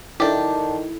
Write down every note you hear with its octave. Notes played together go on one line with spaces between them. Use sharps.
D#3 D4 E4 G4 A4